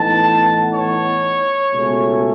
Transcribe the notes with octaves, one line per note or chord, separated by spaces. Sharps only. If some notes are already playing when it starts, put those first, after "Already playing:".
Already playing: A2 E3 B3 D#4 A5
C#5
C#2 B2 A3 C#4